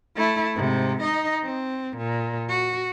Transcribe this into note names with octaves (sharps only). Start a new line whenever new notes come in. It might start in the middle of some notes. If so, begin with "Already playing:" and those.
A3 E4
G#2 C3
D#4 D#5
C4
A#2
F#4